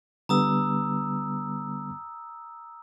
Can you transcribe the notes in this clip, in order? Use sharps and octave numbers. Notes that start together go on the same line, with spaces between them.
D3 G3 B3 A#5 D#6 E6